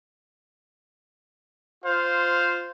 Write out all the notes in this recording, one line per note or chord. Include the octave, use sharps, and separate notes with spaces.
F4 C5 F5